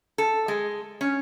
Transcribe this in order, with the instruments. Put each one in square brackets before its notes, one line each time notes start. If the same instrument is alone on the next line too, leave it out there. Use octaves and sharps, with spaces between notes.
[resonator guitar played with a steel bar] A4
G#3
C#4